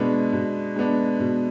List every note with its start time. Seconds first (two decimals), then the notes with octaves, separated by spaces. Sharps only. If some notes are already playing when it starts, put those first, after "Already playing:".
Already playing: B2 G#3 B3 D4
0.33 B2
0.76 G#3 B3 D4
1.20 B2